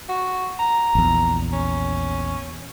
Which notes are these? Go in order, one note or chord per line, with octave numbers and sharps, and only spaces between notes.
F#4
A#5
A#1 E2
C#4